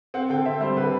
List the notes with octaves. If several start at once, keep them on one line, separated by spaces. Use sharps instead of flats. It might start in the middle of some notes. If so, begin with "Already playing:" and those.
C4 F#5
D3 G5
C4 E5
G3 C5
D3 B4